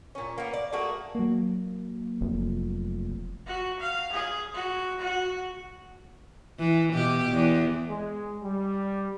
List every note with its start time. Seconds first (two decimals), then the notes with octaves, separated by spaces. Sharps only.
0.15 A#2 C#4
0.38 A#3 B3
0.54 D5
0.73 A3 A#3 F#4 G#4
1.15 F#3 A#3
2.21 F1
3.47 F#4
3.80 F5
4.12 G#4
4.54 F#4
4.99 F#4
6.59 E3
6.94 B2 G4
7.32 E2
7.89 G#3
8.42 G3